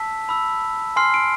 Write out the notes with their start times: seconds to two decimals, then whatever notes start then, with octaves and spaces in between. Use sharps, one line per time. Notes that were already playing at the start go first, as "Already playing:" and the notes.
Already playing: A5 E6 B6
0.29 B5 E6
0.96 G#5 C6 F6 C7
1.14 D7